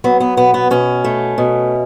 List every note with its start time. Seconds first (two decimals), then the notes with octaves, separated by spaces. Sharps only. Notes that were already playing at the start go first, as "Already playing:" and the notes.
0.04 F#3 B3
0.20 B3
0.37 B2 B3
0.54 B3
0.71 B2 C#4
1.04 A3
1.38 B2